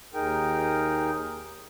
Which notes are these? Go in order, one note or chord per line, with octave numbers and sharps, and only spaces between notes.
D#2 D#4 G#4 A#4 G5